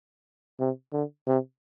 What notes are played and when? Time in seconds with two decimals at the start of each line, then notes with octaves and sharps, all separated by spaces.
0.60 C3
0.93 D3
1.27 C3